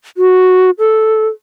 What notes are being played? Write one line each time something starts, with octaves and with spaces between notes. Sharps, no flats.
F#4
A4